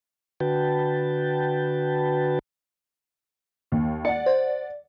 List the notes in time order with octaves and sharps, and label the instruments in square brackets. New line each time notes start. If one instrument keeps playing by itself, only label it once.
[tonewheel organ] D3 F#4 B4 G5 A5
[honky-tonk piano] D#2
[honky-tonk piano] D5 F#5 [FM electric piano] C#7
[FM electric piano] C5